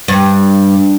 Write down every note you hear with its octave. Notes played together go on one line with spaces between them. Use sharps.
G2